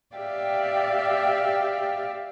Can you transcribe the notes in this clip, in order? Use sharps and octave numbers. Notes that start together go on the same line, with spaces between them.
G4 D5 E5 F5 G5